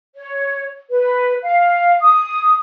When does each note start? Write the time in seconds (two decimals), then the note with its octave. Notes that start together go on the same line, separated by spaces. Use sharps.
0.15 C#5
0.90 B4
1.43 F5
2.01 D#6